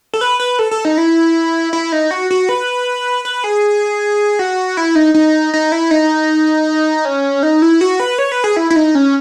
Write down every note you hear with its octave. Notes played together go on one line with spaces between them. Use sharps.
A4
B4
B4
A4
A4
D#4
E4
E4
D#4
F#4
F#4
B4
B4
G#4
F#4
E4
D#4
D#4
D#4
E4
D#4
C#4
D#4
E4
F#4
B4
C#5
B4
G#4
E4
E4
D#4
C#4